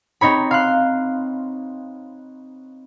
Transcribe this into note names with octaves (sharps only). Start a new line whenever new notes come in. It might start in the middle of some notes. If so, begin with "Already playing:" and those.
C4 D#4 C#5 B5
F5 C6 F#6